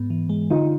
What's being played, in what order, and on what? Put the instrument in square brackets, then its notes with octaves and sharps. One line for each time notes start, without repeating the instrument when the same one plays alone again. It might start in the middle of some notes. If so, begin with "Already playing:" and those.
Already playing: [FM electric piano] G#2 B3
E3
G#3
[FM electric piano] D3 [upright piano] D#4 F4